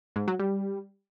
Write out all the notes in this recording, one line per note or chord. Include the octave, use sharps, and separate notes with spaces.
G#2
F#3
G3